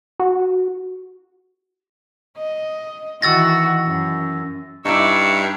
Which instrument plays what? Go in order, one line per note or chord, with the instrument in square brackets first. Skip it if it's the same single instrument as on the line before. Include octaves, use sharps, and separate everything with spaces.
[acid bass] F#4
[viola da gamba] D#5
[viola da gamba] D#3 E3 F#4 [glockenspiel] E6 A6 A#6
[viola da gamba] F#2
[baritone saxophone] G2 [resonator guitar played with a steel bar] D#4 E4 [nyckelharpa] D5 E5 [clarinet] C#6